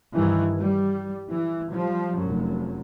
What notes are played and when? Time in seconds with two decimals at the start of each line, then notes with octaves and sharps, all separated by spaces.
0.16 G2 D#3 E3
0.57 G3
1.31 E3
1.69 F3 G3
2.21 F1 F#2